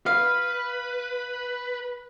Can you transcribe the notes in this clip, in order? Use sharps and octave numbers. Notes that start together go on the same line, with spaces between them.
B4 F5